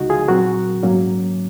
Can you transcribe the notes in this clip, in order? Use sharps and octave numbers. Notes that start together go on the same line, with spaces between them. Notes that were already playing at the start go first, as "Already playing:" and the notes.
Already playing: C#2 C#3 G#3 D#4 F#4
F4 G#4
A#2 F#3 C4 F#4 A#4
G#2 F#3 A#3 C#4